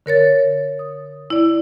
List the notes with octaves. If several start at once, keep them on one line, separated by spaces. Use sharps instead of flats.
D3 A#4 C#5 A6
D#6
E4 D5